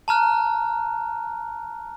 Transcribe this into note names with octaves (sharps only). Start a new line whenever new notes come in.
A5 A#5 F6 F#6